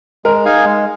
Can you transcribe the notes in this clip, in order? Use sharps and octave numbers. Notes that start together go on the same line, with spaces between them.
G#3 A#4
D#4 G#4 F5 G#5
G#3